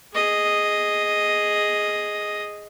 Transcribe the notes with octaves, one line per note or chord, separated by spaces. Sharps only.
G#4 D#5